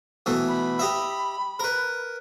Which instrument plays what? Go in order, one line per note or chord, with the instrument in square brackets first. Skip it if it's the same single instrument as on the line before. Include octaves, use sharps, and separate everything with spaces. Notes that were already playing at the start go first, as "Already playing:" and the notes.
[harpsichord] B2 E3 A3
[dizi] B5
[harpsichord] G4 D#5 E5
A#4 B4